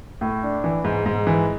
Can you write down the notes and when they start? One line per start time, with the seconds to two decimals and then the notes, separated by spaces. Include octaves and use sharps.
0.21 A2
0.43 D4
0.64 E3
0.84 G#2
1.06 G#2
1.27 E3